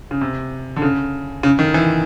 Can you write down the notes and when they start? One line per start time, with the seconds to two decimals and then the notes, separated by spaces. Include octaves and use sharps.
0.11 C#3
0.21 C3
0.76 D3
0.82 C#3
1.43 C#3
1.59 D#3
1.74 E3